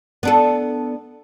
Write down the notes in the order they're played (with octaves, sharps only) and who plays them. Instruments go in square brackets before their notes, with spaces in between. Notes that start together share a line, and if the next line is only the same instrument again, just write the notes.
[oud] B3 D4 A4